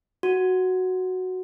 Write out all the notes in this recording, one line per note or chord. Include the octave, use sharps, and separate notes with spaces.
F#4